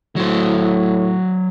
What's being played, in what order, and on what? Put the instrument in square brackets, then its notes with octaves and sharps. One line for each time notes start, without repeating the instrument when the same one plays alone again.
[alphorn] A2 [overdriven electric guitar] F#3 C5